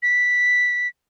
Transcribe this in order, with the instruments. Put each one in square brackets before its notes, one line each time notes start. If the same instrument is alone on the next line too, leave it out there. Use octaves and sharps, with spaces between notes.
[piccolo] B6